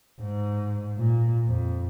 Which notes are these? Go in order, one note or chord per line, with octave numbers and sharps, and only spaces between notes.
G#2
A#2
F2